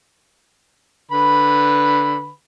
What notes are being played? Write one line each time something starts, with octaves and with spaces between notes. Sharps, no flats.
D3 B4 B5